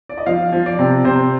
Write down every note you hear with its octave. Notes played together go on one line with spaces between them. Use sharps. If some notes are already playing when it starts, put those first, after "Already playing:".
D5
D#5
F3 F5
F3
D5
C3
C3 C5